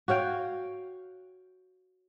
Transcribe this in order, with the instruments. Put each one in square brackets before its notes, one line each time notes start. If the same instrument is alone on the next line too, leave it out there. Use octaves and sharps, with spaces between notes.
[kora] F#4 C#5 F5 G5